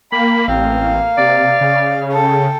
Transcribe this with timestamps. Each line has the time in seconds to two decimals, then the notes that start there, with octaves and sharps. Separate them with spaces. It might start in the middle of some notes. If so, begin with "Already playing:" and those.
0.12 A#3 G5 B5
0.48 A1 A#3 C4 F5
1.18 C3 D5
1.61 C#3
2.13 A4 G5